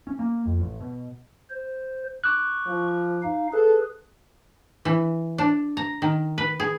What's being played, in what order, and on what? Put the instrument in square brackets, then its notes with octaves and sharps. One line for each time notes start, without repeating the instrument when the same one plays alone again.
[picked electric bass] C#4
A#3
F2
A1
B2
[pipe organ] C5
[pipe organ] C#6 [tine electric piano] D6 F#6
[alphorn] F3
[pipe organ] D#4 F5
[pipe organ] G#4 B4 [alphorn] A4
[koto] E3
D4
A#5
D#3
B4
G#4